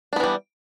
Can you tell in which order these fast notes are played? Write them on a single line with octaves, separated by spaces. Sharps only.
D4 B3 E3 G3